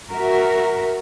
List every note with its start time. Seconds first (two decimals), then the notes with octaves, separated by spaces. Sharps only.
0.12 F#4 A#4 E5